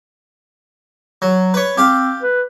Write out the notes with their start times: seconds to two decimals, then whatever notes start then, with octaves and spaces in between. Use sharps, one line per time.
1.22 F#3
1.54 B4 C#5
1.77 C4 G4 F5
2.23 B4